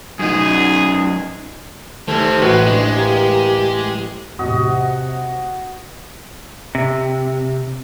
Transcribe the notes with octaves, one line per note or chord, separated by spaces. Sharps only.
F#2 D#4 G#4
D#2 C3 D#3 A3 C4 G#6
A1 G#3 C4 F#4 B4
G#3 D4 D#5
A#3 G4
E2 A2 C3 F#4 D#5
C3